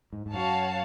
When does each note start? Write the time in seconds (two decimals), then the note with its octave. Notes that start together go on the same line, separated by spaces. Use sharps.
0.13 G#2
0.26 G#2
0.33 F#2 F#4 C#5 F5 A5